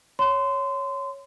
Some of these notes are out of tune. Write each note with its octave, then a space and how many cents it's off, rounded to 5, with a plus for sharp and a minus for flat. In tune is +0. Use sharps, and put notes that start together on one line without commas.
C#5 +0 C6 -25